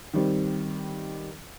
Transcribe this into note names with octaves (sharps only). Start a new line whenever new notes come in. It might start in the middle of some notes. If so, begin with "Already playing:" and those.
D#3 G3 C4